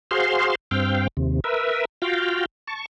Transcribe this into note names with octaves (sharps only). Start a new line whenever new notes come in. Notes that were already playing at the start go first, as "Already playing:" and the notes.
F#4 G#4 C5 F5 C6
G2 C4 F5 G5
D#2 C3
A#4 B4 E5
F4 F#4 F5 G5
A5 C#6